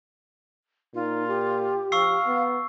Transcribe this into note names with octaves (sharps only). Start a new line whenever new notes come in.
A#2 D#4 F4
G4
F3 F5 C#6 E6 C7
B3